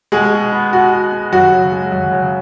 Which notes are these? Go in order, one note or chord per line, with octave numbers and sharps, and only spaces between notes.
B2 G#3 G#4
B2
B3
B2 F#4
B2
B3
F#2 F#4
C#3
G#3
F#2
C#3